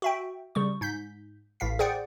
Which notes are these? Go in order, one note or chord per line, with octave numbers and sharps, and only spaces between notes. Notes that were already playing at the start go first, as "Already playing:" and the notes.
F#4 E5 G5
C#3 G3 C#6
G#2 G6 B6
A1 A2 F5 B6
G#4 C5 D5 F#5 G5